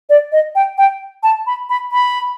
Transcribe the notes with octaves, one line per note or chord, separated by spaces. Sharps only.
D5
D#5
G5
G5
A5
B5
B5
B5